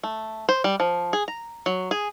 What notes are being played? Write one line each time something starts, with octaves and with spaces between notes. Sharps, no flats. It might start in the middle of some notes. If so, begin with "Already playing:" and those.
A3
C5
G3
F3
G#4
A#5
F#3
G#4